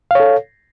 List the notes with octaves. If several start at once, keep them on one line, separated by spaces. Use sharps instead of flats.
A4 C#5 F5